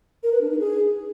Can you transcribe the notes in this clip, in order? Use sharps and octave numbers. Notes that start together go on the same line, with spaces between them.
A#4
B4
D4
D#4
G#4